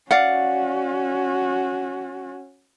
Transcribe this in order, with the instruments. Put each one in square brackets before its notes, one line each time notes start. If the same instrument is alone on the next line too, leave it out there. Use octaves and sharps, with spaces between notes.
[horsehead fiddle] C#4 F#4 [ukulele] D5 F5 F#5